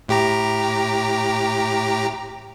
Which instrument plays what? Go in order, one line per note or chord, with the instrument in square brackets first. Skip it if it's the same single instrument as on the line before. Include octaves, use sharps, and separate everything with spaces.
[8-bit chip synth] A2 G4 A#5